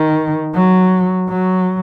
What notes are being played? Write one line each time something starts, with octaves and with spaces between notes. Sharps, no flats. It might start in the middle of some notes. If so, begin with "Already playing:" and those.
Already playing: D#3
F#3
F#3